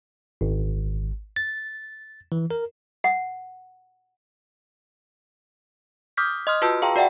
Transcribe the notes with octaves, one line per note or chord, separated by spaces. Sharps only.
G#1
A6
E3
A#4
F#5
D6 D#6 F6 G6 B6
D#5 C6 D#6 F6
F4 F#4 B4 A5 E6
G#4 F5 G5 A#5 C6
F#4 D5 E5 F#5 G5